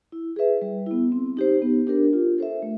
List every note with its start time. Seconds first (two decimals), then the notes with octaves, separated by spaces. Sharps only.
0.12 E4
0.36 G#4 B4 E5
0.62 G3
0.86 B3 E4
1.12 C4
1.37 D#4 G4 C5
1.62 B3
1.87 D4 G4 A#4
2.13 F4
2.38 A4 C5 E5
2.62 A3